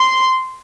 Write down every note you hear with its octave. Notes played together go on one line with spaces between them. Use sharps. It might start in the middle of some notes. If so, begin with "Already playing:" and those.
Already playing: C6